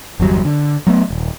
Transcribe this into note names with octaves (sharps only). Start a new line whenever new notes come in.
G1 E2 F#3 G3
D3
F#3 A3 B3
D#1